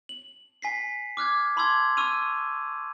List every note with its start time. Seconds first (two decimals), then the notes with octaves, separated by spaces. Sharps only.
0.09 F#7
0.62 G#5 B6 C7
1.17 D6 F6 F#6 G#6
1.56 A5 B5 C6 D6 E6 G#6
1.97 C#6 E6 F6 D#7 F7